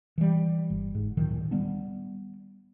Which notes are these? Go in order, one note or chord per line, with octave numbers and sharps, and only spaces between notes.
E3 G3
G1
G#2
D1 A#2 D#3 F#3
G3 B3 D4